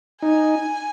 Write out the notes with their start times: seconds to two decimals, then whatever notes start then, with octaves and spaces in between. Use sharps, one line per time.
0.22 D#4 G#5